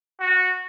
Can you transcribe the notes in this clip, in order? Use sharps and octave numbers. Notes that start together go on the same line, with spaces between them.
F#4